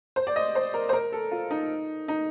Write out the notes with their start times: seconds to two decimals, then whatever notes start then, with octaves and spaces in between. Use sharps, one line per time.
0.16 C5
0.27 D5
0.36 D#5
0.55 C5
0.74 A#4
0.89 C5
0.93 A#4
1.12 A4
1.31 F4
1.51 D#4
2.08 D#4